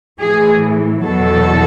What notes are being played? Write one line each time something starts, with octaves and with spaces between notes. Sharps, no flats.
A2 E3 G#4
E2 B2 F#3 A4